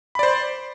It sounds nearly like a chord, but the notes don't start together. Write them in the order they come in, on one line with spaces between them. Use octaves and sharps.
B5 D5 C5